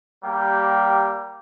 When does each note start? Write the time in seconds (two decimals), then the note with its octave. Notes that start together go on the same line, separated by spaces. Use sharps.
0.24 G3 A#3 G4 G5